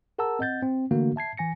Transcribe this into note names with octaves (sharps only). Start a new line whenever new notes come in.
G#4 A#4 F#5 A5 A#5 E6
C4 D#5 F#5 G6 A6
C4
D3 E3 A3 A#3 D4 F#4
E5 A5 G#6 C7
E3 G#5 A#6 C#7